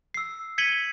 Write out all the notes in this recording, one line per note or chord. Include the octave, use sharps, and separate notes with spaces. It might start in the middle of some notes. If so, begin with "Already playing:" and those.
E6 C7
G#6 B6 C#7 D#7 F#7 G7